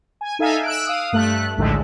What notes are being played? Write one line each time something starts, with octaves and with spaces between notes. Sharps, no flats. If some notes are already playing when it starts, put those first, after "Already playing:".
G#5
D#4 A4 E5 F5 G#5
E6 F#6 D7
F5 D#6
G2 A3 F#6
A#1 D#2 A2 D3 G#3 A3